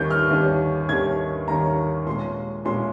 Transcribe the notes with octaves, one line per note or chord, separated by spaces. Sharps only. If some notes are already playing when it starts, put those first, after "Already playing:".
Already playing: D#2 D#3 G3 C#4 G6
F6
D#2 D#3 G3 C#4
D#2 D#3 G3 C#4 G#6
D#2 D#3 G3 C#4 A#5
A#2 G#3 C#4 C6
A#2 G#3 C#4 C6